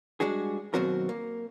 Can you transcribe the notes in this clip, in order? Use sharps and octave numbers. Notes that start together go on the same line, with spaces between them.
G3 G#3 D4 F#4 G#4
D#2 B2 F#3 C4 F#4 A#4
A#3